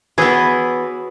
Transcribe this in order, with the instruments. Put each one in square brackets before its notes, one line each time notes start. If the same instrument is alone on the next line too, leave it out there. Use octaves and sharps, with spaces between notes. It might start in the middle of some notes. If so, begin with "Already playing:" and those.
[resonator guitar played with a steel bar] E3 B3 [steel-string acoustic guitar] F#4 B4 C#5 [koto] G#4